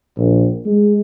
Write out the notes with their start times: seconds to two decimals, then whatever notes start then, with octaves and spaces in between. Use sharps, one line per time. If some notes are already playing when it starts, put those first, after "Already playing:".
0.17 A#1
0.65 G#3